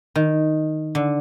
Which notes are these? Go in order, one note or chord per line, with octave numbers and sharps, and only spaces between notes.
D#3
D3